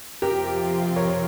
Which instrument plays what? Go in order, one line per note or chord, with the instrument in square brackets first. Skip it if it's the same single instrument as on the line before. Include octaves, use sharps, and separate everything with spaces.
[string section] F2 C3 F3 C4 F4 [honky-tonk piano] G4 A#4
[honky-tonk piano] A#4 C#5